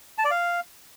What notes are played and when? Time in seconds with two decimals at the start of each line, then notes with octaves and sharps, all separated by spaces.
0.18 A5
0.25 D5
0.31 F5